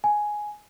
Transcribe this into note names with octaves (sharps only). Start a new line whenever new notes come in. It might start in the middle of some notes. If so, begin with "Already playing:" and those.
G#5